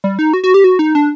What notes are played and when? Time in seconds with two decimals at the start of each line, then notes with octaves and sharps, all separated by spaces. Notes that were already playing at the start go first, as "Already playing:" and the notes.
0.04 G3
0.19 D#4
0.34 F#4
0.44 F#4
0.54 G4
0.64 F#4
0.79 D#4
0.95 D4